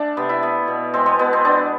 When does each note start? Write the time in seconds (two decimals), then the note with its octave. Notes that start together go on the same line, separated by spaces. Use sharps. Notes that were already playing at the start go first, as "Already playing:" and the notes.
Already playing: A3 D4
0.17 C3 B3
0.29 E4
0.43 B3
0.68 B2
0.94 G#3 C4
1.06 B3
1.19 B2 B3
1.33 C4
1.45 B3 D4